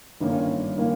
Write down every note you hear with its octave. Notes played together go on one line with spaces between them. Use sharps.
G1 G2 D#3 A#3 C#4
D#3 A#3 C#4